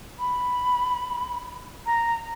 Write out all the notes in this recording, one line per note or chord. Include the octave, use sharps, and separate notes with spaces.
B5
A#5